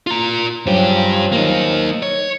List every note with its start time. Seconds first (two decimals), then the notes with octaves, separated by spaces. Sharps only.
0.07 F4 A#5
0.66 G2 C#3 F3 F#3 G4
1.32 A#3 D#4
2.03 C#5